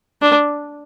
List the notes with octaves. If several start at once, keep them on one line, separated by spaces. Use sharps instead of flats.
D4